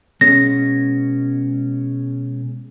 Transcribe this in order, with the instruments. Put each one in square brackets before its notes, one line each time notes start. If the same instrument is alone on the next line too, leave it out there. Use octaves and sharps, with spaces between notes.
[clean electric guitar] B2 G#3 C#4 [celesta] A#6